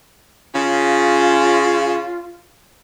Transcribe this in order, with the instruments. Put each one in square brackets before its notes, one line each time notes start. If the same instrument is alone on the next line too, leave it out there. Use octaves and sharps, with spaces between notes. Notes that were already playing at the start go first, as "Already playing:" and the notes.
[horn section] C#3 [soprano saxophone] F4